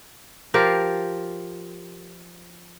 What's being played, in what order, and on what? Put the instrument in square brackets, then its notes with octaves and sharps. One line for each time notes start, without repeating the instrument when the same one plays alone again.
[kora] F3 F4 G4 A#4